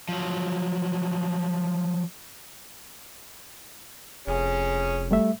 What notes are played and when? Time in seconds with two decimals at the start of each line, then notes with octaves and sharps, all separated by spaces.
0.09 F3 F#3
4.27 F1 C#4 G#4
5.11 G3 A3 E5